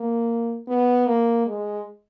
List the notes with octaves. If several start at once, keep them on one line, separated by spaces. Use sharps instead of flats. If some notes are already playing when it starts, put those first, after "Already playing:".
Already playing: A#3
B3
A#3
G#3